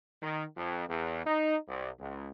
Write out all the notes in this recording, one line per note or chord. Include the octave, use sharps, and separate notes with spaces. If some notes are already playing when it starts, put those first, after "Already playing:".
D#3
F2
E2
D#4
C2
C#2